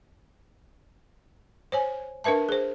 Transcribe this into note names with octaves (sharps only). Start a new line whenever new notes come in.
C5 C#5 G#5
D4 A#4 B4 E5 A5
G#4 C5